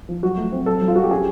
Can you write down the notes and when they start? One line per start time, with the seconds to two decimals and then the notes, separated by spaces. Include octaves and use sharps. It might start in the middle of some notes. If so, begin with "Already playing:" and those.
0.09 F3
0.23 F#3 F#4
0.37 A3
0.52 C4
0.66 F#3 A4
0.81 F#3
0.88 F4
0.96 F#3 F#4
1.03 G4
1.11 C#4 G#4